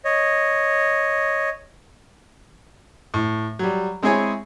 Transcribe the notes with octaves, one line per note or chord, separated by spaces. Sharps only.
C#5 D#5
A2
F#3 G3
G#3 C4 E4 G#4 C#5 G#5